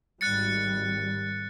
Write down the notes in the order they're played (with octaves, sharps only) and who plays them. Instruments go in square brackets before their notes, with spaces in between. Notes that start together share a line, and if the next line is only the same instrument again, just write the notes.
[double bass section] G#1 G3 [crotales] F#6 A6 C#7